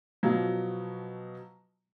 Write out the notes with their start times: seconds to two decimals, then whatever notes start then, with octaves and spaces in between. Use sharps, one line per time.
0.23 B2 F3 F#3